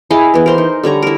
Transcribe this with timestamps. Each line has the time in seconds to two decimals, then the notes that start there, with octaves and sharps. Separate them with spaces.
0.11 E4 G#4 D#5 F5
0.34 E3 B3
0.46 A#4 C5 C6
0.58 D#4
0.84 D3 G3 C#5 A#5
1.02 E4 A#4